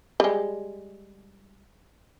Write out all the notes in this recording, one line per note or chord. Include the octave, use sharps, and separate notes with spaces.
G3 G#3